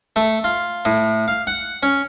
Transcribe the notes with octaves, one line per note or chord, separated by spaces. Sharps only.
A3
F4
A2
F5
F#5
C#4